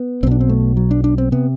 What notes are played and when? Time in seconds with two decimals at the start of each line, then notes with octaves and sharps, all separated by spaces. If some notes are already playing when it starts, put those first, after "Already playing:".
Already playing: B3
0.23 B1 C4
0.27 B2 D4
0.41 C4
0.49 A3
0.77 F#3
0.91 D4
1.04 D4
1.18 C4
1.32 C3 B3